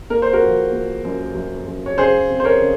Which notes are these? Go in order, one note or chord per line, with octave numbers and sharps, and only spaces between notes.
A#3 A#4
C5
F#4 A#4
F3
A#3
F#2
F#2
F#2
C#5
C#3 G#4 C5
C4
C5
A#4 C#5
C#3